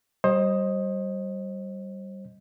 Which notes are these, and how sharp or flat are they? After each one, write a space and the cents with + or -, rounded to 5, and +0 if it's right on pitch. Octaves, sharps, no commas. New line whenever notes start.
G3 -20 C5 +30 D#5 +0